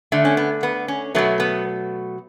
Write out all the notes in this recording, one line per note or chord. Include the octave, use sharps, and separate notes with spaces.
D3 A3
C#4
B3
B3
C#4
B2 F#3 A3 B3
B3